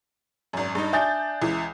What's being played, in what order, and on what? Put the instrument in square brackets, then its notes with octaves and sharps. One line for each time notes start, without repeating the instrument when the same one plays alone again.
[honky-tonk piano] G#1 F#2
G2 D#4
[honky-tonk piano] D4 G6 A6 [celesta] E5 G#5 D#6
[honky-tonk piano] C#2 E3